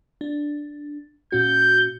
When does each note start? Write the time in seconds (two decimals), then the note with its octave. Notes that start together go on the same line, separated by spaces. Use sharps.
0.21 D4
1.32 A#2 C#4 F#4 G6